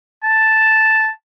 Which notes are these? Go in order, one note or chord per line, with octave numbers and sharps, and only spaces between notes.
A5